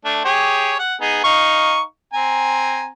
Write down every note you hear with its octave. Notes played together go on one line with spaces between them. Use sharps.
A3 D4
G4 G#4 C#5
F#5
B3 D#4 G#4
D#4 F5 C#6
C4 G#5 A#5